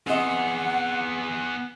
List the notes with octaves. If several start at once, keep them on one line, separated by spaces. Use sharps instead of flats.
B3 C4 G#4 D#5 F#5